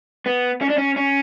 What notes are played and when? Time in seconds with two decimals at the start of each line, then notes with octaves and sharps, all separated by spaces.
0.26 B3
0.61 C#4
0.69 D4
0.78 C#4
0.96 C#4